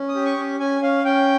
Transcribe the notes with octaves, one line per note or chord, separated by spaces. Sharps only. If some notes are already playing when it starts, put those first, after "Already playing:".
Already playing: C#4
D#6
G4
C#6
C#4
C#4 G#5
C#4 F5
C#4 G5